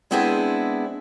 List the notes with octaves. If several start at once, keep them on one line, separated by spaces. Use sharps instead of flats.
G#3 B3 C4 D4 E4 G#4